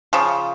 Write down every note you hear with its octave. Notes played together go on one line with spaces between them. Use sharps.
C#3 F3